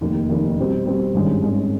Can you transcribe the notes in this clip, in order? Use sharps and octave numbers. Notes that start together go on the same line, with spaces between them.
F1 D#2 D#3
F1 D#2 D#3
B2 G3 C4
B2 G3 C4
G#1 G2 D#3 G#3 C#4
G#1 G2 D#3 G#3 C#4